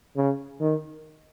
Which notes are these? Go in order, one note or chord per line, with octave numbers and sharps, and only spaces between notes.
C#3
D#3